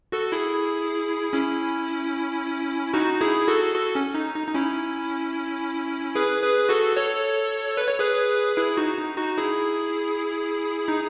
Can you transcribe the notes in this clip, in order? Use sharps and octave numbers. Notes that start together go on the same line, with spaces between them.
F#4 A4
E4 G#4
C#4 E4
D#4 F#4
E4 G#4
F#4 A4
F#4 A4
C#4
D#4
D#4
D#4
C#4 E4
G#4 B4
G#4 B4
F#4 A4
A4 C#5
B4
C#5
G#4 B4
E4 G#4
D#4 F#4
D#4
D#4 F#4
E4 G#4
D#4